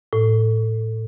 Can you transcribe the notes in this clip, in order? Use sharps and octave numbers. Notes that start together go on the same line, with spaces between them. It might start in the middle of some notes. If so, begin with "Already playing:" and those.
A2